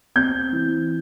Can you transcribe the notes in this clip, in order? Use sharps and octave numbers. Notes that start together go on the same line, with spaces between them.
C4 G6
E3